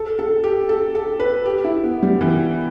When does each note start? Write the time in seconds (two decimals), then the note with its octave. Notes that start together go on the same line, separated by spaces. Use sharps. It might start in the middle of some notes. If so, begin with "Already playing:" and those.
Already playing: A4
0.19 A4
0.44 G4
0.69 A4
0.95 A4
1.20 B4
1.46 G4
1.64 E4
1.84 B3
2.03 G3
2.21 E3